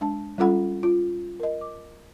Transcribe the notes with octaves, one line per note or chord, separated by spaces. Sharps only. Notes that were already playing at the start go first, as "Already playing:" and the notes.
G#3 D4 A5
G3 C#4 F4 A4 F#5 B5
F4
A#4 D#5
D6